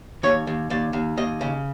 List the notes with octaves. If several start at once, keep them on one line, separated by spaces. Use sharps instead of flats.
D#2 C#5
D#2
D#2 D5
D#2
D#2 D#5
C#3